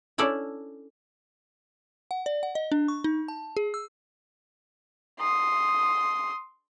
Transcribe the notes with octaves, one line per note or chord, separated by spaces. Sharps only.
C#4 D4 E4 A4 D5
F#5
D5
F#5
D#5
D4
C#6
D#4
A5
G#4
E6
C6 D#6